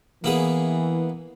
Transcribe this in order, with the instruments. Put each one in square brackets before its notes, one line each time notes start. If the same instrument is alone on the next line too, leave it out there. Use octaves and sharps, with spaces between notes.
[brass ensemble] E3 [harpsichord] A#3 B3 G#4